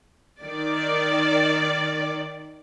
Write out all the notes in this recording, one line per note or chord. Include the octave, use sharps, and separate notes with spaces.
D#3 D5